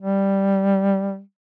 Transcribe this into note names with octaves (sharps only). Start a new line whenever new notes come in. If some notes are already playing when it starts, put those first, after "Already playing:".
G3